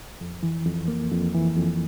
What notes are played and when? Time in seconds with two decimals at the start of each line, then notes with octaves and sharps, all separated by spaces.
0.21 F2
0.43 E3
0.66 F2
0.88 A#3
1.12 F2
1.34 E3
1.57 F2